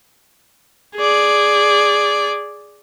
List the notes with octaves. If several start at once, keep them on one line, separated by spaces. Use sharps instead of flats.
G#4 D5